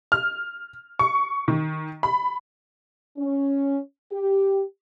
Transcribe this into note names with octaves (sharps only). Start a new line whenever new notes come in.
F6
C#6
D#3
B5
C#4
G4